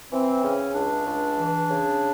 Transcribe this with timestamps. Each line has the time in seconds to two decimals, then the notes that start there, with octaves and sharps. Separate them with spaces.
0.11 E3 C4
0.43 C#3 C#4
0.74 C#2 D4
1.06 C#2
1.37 E3
1.69 C#3